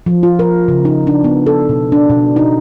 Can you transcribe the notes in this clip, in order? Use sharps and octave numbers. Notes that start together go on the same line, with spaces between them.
F3
F4
A#4
C#3
D#4
D4
B3
A4
B2
D4
B2
D#4